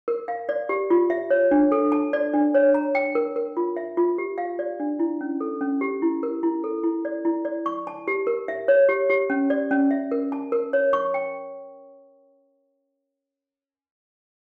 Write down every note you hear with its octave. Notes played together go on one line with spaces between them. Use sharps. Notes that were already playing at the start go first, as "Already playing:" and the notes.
A#4
F5
D5
G4
F4
E5
C#5
D4
A4
A5
D5
D4
C#5
A#5
G5
A#4
A#4
F4
E5
F4
G4
F5
D5
D4
E4
C#4
A4
C#4
G4
E4
A#4
E4
A4
E4
D5
E4
D5
C#6
A5
G4
A#4
E5
C#5
G4
G4
C#4
D5
C#4
E5
A#4
A5
A#4
C#5
C#6
G5